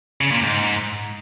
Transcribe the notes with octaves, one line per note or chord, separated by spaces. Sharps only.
C#3
A#2
G#2